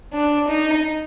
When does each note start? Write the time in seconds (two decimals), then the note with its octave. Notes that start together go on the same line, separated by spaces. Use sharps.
0.13 D4
0.48 D#4